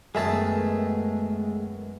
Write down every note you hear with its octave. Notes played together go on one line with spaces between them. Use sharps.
F#2 D#3 G#3 A3 B3 G#4 E5 A5